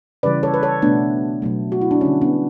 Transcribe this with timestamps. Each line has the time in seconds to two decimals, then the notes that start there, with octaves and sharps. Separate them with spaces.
0.23 C#3 E3 G3 B4 D5
0.43 A4 C#5
0.54 B4
0.63 A4 C#5
0.82 B2 A3 B3 D4
1.42 B2 F#3 A3
1.72 F#4
1.81 E4
1.91 D4
2.01 D3 G3 C#4
2.21 B3 D4